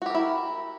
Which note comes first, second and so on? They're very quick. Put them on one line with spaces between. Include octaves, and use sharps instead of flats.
F#4 G4 A#4 E4